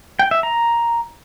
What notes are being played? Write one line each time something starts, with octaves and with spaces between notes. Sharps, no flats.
G5
E5
A#5